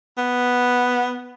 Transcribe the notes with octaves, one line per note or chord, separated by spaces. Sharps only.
B3